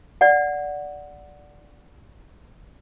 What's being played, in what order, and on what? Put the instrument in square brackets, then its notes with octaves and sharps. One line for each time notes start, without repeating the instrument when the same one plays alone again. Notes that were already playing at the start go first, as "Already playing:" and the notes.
[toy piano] D5 F#5